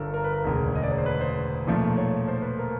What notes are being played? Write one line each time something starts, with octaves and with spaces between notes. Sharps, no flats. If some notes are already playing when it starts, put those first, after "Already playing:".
Already playing: G1 G2 D3 A4 A#4
A#4
B4
A#4
E1 D2 C#3
D#5
D5
C#5
C5
B4
C5
B1 A#2 F3 A3
C#5
C5
B4
A#4